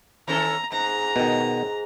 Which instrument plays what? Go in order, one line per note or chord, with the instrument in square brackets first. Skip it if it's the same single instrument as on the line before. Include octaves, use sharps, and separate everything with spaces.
[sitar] D#3 C#4 A4 [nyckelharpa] A#5
[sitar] G#2 [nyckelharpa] A#5
[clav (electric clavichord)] B2 D#3